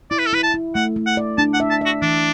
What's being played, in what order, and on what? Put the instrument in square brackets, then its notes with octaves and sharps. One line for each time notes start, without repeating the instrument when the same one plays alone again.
[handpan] E4 [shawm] D5
[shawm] B4
A4
[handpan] E4 [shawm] B4
[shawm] A5
[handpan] E4
[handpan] A3 [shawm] F#5
[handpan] A3
[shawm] F#5
[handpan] D5
[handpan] D4 [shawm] A5
[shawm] F#5
[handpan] E5
[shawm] A5
[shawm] F#4 [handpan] E5
[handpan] E3 [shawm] D4